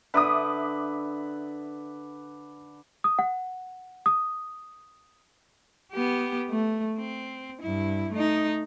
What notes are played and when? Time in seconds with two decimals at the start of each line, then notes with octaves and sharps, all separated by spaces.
0.14 D3 B4 E5 D6 D#6
3.04 D#6
3.19 F#5
4.06 D#6
5.92 B3 G4
6.49 A3
6.98 C4
7.61 G2 E4
8.12 A3 D#4